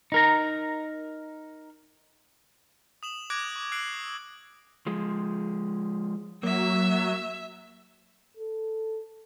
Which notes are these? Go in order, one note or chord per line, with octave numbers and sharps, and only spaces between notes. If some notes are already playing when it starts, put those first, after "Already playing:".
D#4 A#4 A#5
D#6 E7 F#7
D6 F#6 G#6 A#6 D7
C#6
E6 F#6 C7 D7 F#7
F3 G#3
F#3 A#3 E5
A4